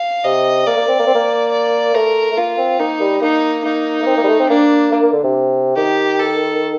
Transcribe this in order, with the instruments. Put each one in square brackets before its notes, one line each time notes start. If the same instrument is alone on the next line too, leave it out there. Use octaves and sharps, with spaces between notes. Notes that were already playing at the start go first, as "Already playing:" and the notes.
Already playing: [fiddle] F5
[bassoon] C3 [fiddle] D#5
[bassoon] A#3 [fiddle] D5
[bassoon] A#3
C4
A#3
C4
A#3
[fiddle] D5
[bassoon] A3 [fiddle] A#4
[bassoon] A3
[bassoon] A#3 [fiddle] F4
[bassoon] C4
[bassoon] A#3 [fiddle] D#4
[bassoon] G3
[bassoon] A#3 [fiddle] D#4
[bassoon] A#3 [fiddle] D#4
[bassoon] A#3
C4
A#3
G3
A3
C4
[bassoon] A#3 [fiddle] D4
[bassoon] A#3
A#3
D3
C3
[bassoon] D#3 [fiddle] G4
[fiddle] A4